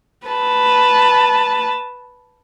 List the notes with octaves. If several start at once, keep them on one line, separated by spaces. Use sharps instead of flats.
B4 A5